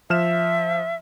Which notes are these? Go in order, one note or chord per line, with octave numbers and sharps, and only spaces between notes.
F3 E5 F6 E7